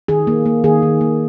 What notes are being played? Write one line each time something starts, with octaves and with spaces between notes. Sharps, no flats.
D#3 G#4
A#3
A#3
D#3 G#4
D#3
A#3